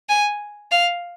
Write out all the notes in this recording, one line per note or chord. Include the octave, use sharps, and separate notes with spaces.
G#5
F5